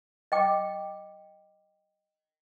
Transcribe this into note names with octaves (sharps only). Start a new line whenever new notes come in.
D#5 G5 D6